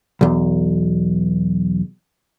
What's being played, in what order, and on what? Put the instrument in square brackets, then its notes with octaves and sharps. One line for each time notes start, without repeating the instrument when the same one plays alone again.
[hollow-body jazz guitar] B1 E2